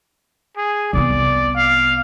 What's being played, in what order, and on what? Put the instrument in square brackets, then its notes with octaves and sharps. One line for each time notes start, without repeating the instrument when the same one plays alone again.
[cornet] G#4
[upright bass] C2 B3 [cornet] D5
[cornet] F5